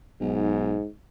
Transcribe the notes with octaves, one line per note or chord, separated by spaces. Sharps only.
B1 G#2